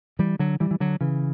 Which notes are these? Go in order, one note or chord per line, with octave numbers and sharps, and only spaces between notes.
E3 G3
D3 F#3
E3 G3
E3
D3 F#3
C#3 E3